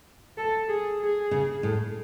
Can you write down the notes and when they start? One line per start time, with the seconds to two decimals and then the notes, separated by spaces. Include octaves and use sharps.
0.37 A4
0.69 G#4
1.00 G#4
1.31 C#3
1.63 A2